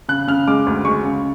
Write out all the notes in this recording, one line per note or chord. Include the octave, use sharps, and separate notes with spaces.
C#3 F#6
C#3 F6
G#3 D6
D2
G#3 C#6
C#3